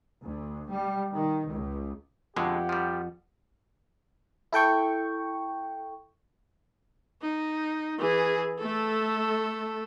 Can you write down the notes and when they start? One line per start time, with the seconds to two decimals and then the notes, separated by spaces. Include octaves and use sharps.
0.23 D2
0.71 G3
1.13 D#3
1.52 C#2
2.36 F2 B2 D3 G#3 G4 F#5
2.69 F3 G3
4.53 E4 A4 G5 C#6
7.22 D#4
7.99 E3 G#4
8.59 A3 A4